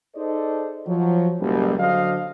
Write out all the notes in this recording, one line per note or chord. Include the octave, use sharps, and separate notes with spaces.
D#4 G#4 A4 C5 D5 D#5
F3 F#3
F#1 B1 G3
D3 F#3 D4 C5 D#5 F5